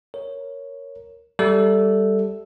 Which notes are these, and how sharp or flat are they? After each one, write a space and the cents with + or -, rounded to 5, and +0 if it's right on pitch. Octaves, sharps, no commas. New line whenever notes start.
A#4 +0 C#5 +0
G3 +0 A4 +0 E5 +0